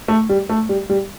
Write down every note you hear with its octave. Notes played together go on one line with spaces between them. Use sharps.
A3
G3
A3
G3
G3